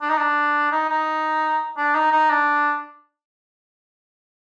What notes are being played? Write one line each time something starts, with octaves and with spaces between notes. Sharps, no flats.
D4
D#4
D4
D#4
D#4
D4
D#4
D#4
D4